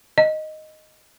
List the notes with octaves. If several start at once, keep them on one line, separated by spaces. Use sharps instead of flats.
D#5